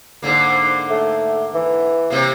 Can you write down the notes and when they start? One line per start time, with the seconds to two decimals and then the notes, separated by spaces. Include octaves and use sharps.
0.22 G#2 D3 A#3
0.90 A3
1.54 E3
2.10 C3 A#3